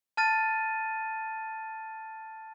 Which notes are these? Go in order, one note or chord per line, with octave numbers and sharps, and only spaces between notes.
A5 F6 A6 D#7